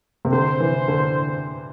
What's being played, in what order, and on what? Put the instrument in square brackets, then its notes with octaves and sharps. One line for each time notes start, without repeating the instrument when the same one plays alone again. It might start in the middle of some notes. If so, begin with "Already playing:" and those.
[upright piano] C3
[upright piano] D3 [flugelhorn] C5
[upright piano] E3
D3